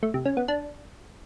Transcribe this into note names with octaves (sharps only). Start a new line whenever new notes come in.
A3
C3
C#4
B3
D4